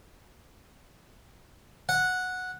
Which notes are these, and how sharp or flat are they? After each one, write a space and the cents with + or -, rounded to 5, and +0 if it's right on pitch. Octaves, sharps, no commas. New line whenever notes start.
F#5 -10